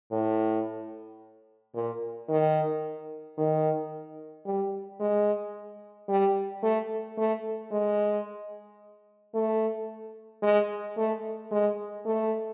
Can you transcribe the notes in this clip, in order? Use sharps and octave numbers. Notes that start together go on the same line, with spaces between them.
A2
A#2
D#3
D#3
G3
G#3
G3
A3
A3
G#3
A3
G#3
A3
G#3
A3